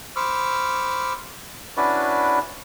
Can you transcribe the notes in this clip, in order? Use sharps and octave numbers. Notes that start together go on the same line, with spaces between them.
C5 B5 C#6 D6 E6 F6
C#4 D4 E4 F#4 B4 D5